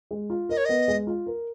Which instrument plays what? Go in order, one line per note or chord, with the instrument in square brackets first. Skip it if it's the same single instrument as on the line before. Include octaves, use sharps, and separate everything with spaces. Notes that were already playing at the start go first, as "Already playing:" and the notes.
[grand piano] G#3
F4
[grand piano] A#4 [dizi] D#5
[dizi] C#5
[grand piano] B3 [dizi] D#5
[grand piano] G#3
F4
A#4